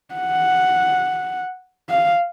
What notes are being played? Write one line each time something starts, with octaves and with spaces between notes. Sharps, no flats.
F#5
F5